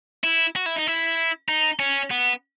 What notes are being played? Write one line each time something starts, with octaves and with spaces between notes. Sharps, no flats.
E4
F#4
E4
D#4
E4
D#4
C#4
B3